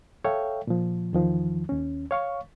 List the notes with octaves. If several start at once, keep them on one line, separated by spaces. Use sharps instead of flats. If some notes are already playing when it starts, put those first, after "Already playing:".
A4 C#5 E5 F5 G5
A#2 F3
E2 D#3 F3
D#2 C#4
C#5 F5 C#6